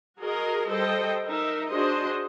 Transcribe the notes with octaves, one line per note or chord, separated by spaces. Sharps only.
F#4 G#4 A#4 D#5
G3 A4 C5 D#5 G5
D#4 A#4 E5
D4 F#4 G#4 C5 D#5